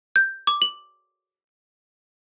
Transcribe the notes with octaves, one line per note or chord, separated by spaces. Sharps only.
G6
D6
F#7